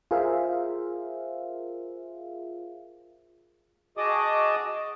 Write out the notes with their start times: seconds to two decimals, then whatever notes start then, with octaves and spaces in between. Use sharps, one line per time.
0.11 F4 G#4 A#4 C5 E5 F5
3.97 F#4 G#4 D#5 A5 D6 D#6